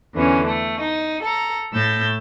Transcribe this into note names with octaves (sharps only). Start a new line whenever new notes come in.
E2 D3 E3 C#4
A3
D#4
A4 A#5
A2 A3 E6 G6 A6